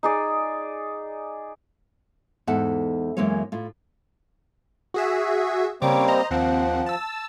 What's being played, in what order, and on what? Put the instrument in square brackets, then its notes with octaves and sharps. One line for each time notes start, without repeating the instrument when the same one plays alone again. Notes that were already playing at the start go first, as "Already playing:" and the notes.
[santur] D#4 G#4 D5
[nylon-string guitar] E2 G#2 A4 F#5
F#2 E3 G#3 A#3 C#5
A2 F4
[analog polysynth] F#4 G#4 E5
[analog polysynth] C#3 C#5 D6 [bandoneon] G3 A#3 C4
[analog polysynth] C5 D#5 A#5
[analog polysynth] D#2 C4 F#5 [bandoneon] F3
[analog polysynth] A5 E6